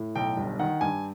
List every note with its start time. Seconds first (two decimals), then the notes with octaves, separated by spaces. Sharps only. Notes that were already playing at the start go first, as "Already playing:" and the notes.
Already playing: A2
0.15 B1 G5
0.37 G1
0.59 D#3 F#5
0.81 G2 G#5